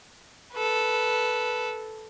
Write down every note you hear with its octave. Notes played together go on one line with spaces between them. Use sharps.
A4 B4